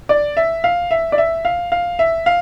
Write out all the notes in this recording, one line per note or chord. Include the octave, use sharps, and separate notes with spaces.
D5
E5
F5
E5
D5
E5
F5
F5
E5
F5